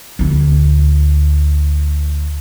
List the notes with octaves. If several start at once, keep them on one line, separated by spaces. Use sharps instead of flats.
D2 E4